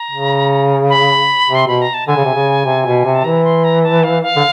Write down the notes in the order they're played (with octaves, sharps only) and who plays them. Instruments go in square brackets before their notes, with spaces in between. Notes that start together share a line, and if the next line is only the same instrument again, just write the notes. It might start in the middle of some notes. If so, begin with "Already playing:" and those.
Already playing: [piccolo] A#5
[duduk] C#3
[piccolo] B5
[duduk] C3
[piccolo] C6
[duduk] B2 [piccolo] B5
[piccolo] A#5
A5
[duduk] D3 [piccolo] G#5
[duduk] C#3
C3
C#3
C3
B2
C3
[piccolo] A5
[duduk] E3 [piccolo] A#5
[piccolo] C6
A#5
A5
F5
F5
[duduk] D3